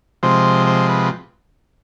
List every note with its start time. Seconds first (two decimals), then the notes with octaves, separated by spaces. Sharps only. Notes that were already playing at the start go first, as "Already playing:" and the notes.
0.23 C3 F3 G#3 C5
0.67 C5
0.89 B4